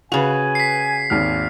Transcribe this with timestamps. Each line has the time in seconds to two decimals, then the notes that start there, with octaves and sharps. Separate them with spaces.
0.12 C#3 F#4 B4 G#5 F7
0.55 B6 C7
1.10 G#1 D#2 F6